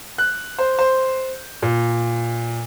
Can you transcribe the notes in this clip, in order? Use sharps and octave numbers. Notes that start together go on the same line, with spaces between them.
F#6
C5
C5
A#2